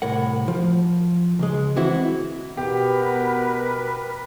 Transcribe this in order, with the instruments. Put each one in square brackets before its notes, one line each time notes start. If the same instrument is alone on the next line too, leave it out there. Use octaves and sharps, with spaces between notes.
[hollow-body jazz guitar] C2 A2 A#4 F#5
F3
C#2 G#3
E3 C4 E4 F#4
[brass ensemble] B2 [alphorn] B3 [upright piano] G4 [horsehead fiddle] A#4 B4